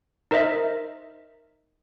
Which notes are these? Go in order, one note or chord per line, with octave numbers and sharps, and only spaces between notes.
D#4 A#4 C5 D#5 E5